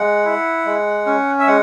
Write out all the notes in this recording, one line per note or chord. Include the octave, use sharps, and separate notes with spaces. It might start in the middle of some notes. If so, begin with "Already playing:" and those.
Already playing: G#3 F#5
E4
G#3
C#4
E5
G#3 F#5